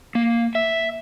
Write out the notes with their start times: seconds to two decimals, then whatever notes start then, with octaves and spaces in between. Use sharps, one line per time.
0.15 A#3
0.55 E5